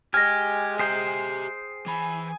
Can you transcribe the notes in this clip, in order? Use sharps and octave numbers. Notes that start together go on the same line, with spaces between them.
G#3 G4 G#5 F6 A#6
G4 G#4 C5 E5 G5
E3 G#5 B5